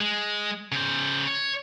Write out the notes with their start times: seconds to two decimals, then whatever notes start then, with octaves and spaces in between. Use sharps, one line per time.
0.01 G#3
0.72 C#3 C5
1.27 C#5